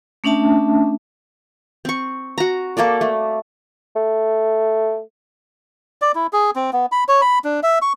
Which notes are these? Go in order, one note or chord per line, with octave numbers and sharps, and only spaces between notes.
A3 C#4 D4 E5 A5
C4 C#6
F#4 A#5
A#3 A4 A#4 D5
A3
A3
D5
E4
G#4
C4
B3
B5
C#5
B5
D4
E5
C#6